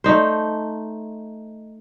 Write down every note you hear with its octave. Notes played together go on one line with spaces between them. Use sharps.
A3 D#4 C5